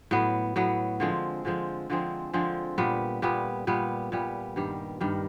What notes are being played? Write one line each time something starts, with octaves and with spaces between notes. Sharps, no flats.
A2 F#3 B3
A2 F#3 B3
D3 F3 G#3 C4
D3 F3 G#3 C4
D3 F3 G#3 C4
D3 F3 G#3 C4
A#2 G3 B3
A#2 G3 B3
A#2 G3 B3
A#2 G3 B3
G2 D#3 G3
G2 D#3 G3